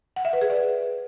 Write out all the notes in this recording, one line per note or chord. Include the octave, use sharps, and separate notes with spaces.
F#5
E5
B4
G#4
D5